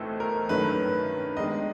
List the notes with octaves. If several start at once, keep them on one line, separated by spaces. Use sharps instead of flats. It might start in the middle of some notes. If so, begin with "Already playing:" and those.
Already playing: B1 A2 E3 A3 C4 A4
A#4
G2 D#3 F#3 A3 C#4 B4
D#3 G#3 B3 D4 G4 D#5